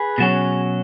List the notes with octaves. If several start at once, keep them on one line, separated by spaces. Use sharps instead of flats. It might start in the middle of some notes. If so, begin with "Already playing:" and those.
Already playing: G#4 B4
B2 F#3 C#4